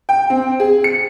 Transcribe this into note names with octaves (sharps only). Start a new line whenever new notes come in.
G5
C4
G#4
C#7